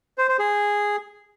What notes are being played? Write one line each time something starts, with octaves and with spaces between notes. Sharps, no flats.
C5
C5
G#4